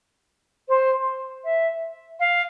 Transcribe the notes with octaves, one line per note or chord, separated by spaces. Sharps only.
C5
E5
F5